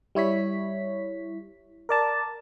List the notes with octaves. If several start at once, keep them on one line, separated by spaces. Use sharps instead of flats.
G3 E4 C#5 B6
A#4 D5 A5